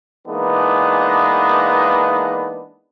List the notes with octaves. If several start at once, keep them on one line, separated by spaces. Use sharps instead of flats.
E3 G#3 A#3 B3 D4 D#4